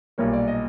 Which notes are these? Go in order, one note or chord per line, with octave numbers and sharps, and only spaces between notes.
B1 A#2 G3 A#3 C#5
D5
D#5